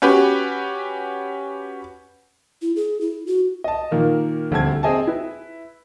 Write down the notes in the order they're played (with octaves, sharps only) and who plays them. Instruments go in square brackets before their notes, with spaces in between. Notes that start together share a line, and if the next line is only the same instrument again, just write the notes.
[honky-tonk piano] C#4 F#4 G4 B4
[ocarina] E4
G#4
E4
F#4
[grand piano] D#5 A5
A#2 D#3 A#3
D#1 D2 C4 A5 G#6
C4 G#4 D#5 G#5 A5
E4 B4